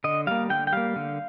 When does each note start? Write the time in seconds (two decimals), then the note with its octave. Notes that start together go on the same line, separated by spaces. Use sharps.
0.04 D3 D#5
0.27 G3 A#3 F5
0.50 D3 G5
0.67 G5
0.72 G3 A#3 F5
0.96 D3